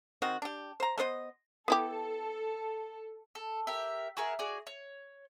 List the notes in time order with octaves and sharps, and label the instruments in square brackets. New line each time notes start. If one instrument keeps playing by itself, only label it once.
[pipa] D#3 C4 F#4
D4 G4
C5 A#5
A3 B3 C5 D#5
[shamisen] B3 E4 G4 [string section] A4
[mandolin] A4
G4 A#4 E5
F#4 G#4 A#4 E5
F#4 G#4 D5
C#5